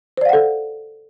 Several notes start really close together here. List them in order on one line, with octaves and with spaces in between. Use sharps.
C5 D5 F5 F#5 A4